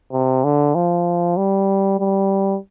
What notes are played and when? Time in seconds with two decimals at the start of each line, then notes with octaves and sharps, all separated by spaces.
0.13 C3
0.44 D3
0.75 F3
1.37 G3
2.00 G3